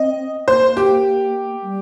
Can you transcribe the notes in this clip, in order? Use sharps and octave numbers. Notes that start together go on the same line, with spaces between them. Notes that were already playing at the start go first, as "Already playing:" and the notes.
Already playing: C4 D#5
A#3 C5
G4
G3